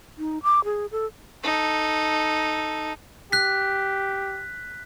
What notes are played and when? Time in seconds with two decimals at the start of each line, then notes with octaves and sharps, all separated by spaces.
0.18 D#4
0.43 D6
0.64 G#4
0.92 A4
1.43 D#4 A4
3.32 G4 F#6 B6